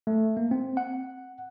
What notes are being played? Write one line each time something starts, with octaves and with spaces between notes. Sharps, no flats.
A3
A#3
C4
F#5